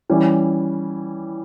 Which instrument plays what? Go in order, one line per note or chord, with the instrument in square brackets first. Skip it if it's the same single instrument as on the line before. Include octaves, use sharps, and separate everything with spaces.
[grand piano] E3 G3 C#4